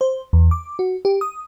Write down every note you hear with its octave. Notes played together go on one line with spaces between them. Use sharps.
C5
E2
D6
F#4
G4
D#6